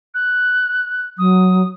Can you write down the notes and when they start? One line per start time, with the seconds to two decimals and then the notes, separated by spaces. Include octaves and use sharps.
0.14 F#6
1.18 F#3 D#6